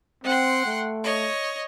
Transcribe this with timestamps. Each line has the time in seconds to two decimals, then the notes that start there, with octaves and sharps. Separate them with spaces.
0.24 C4 F#5 G5 C6
0.66 A3
1.03 C#5 D#5